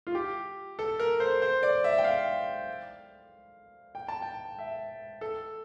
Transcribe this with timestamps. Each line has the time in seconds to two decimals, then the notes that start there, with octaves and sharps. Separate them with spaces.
0.07 F4
0.15 G4
0.79 A4
0.99 A#4
1.20 C5
1.42 C5
1.63 D5
1.84 E5
1.98 G5
2.04 F5
3.95 G5
4.08 A5
4.22 G5
4.59 E5
5.21 A4